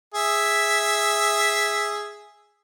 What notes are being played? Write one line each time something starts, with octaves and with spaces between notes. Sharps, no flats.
G#4 E5